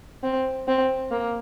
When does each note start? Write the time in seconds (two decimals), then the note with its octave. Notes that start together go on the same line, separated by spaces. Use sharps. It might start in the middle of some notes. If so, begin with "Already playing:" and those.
0.23 C4
0.68 C4
1.11 A#3